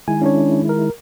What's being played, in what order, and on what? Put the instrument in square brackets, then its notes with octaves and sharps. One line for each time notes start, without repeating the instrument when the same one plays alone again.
[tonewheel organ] D#3 G#3 E4 [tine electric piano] G#5
[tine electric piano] C#4 D4 C#5
A#4